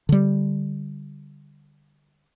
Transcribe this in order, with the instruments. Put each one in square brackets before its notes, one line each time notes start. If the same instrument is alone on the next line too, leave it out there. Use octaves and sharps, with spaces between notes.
[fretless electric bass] D3 G3